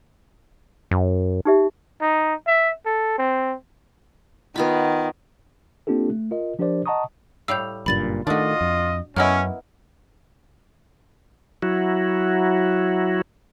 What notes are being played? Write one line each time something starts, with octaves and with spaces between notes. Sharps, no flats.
F#2
D#4 G4 E5
D#4
E5
A4
C4
D#3 B3 F4 B5
A#3 C4 D4 F4 G4 A4
A3
F4 A#4 D#5
F3 D4 G4 A#4 C5 D5
D#5 F#5 A5 A#5 C#6 D#6
A2 G3 F5 E6 G6
F#1 G2 A#2 B5 A6 F#7
D#3 A3 D4 F4 F#4 D#5
F2
F#2 A#3 B3 C#4 E4 D#5 F#5 F6
F#3 E4 F#4